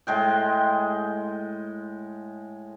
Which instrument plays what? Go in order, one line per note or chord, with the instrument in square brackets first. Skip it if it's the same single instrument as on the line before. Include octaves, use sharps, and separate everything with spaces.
[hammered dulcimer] A2 G#3 G5